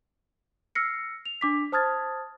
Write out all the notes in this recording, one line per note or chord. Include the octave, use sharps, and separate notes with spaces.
E6 F6 A#6 C7 C#7
F7
D4 D6 B6
C5 A5 D#6 F6 G#6 A6